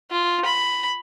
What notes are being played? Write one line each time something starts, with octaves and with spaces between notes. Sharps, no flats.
F4
B5